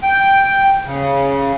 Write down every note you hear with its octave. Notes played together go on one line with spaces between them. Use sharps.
G5
C#3